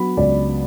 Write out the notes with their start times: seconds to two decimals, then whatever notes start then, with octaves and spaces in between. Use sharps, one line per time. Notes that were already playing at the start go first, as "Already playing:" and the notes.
Already playing: F#3 B3 B5
0.17 C#2 D5